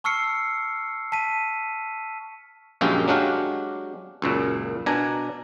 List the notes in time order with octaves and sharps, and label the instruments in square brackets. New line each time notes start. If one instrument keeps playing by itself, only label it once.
[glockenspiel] A5 C#6 E6 F6 C7 C#7
A5 B6 D#7
[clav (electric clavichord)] A#1 F#2 G#3 A#3 F4 G4
F#3 G#3 D4 F#4 G4 F5
C#2 F#2 A#2
B2 D4 G#5 A#5